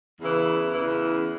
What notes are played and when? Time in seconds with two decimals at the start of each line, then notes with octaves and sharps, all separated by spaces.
0.19 E2 C#3 E3
0.74 E2 C#3 E3